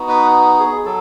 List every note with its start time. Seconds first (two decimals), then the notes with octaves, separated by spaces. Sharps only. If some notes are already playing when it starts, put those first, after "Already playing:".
Already playing: B3 D#4 F#4
0.09 B4
0.59 G#4
0.86 F#3 A4